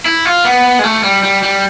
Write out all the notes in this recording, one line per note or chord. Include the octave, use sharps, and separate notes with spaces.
E4
F4
B3
G#3
A3
G3
G3
G3